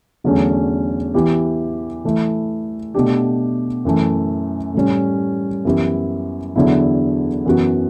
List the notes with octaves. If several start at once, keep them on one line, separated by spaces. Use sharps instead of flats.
E2 D3 F#3 A3 C#4
E3 B3 E4 G4
E3 A3 E4
B2 A3 D4 G4
F#2 E3 A3
A2 G3 C#4
F#2 E3 B3 E4 G4
E2 D3 F#3 B3 E4
F#2 E3 B3 F#4